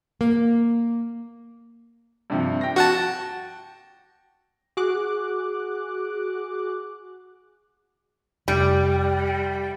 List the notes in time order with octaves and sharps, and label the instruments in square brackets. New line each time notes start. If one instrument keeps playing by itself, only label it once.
[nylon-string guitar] A#3
[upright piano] G2 C3 F3
G5 A#6
[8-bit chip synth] F#4 F#5 A5
[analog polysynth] F#4 G#4 D6 F#6
[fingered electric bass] F1 [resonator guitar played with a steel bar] G3